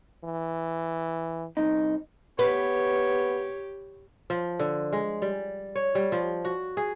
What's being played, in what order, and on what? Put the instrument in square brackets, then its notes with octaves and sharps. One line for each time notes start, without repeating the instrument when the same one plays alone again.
[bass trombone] E3
[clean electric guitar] C2 D#4
[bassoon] B3 [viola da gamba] G4 [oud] B4 [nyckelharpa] C#5
[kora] F3
D3
G#3
G3
C#5
G3
F3
F#4
G#4